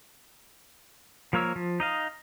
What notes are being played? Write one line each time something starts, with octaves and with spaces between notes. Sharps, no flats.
F3 A#3 A#4 C#5 E6
F3
D#4 D#5 F5